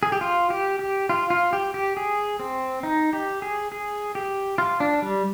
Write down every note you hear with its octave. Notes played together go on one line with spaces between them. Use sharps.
G#4
G4
F4
G4
G4
F4
F4
G4
G4
G#4
C4
D#4
G4
G#4
G#4
G4
F4
D4
G3